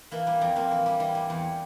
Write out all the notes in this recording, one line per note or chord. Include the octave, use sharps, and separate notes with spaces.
E3 A#3
G3
F2
F2 A#3
E3
G3
E3
G3
E2